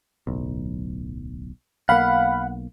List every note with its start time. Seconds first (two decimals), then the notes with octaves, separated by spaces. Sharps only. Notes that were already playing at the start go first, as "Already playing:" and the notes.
0.27 D1 B1
1.89 B1 A#3 F5 F#5 B5